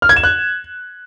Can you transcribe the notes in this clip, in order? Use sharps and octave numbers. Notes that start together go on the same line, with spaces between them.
F6
G#6
E7
F#6